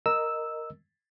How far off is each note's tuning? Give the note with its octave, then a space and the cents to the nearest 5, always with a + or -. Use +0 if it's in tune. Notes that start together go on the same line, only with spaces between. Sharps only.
A#4 +0 D#5 -5 E6 -5